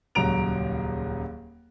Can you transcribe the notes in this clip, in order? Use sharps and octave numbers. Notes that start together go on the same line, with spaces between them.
D#1 C#2 F#3 A#5 D7 F7